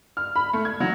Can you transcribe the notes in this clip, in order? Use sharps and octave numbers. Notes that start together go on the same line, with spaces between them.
F6
B5
A3
G#6
F#3